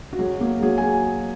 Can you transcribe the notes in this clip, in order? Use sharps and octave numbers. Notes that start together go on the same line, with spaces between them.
F#4
F#3 G#4
A#3 G#4
F#3 G#4
G#5